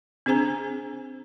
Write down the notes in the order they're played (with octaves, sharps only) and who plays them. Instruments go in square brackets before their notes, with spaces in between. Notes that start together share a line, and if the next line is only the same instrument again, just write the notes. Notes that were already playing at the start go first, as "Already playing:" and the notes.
[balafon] C4 D4 G#4 C5 G#5 A#5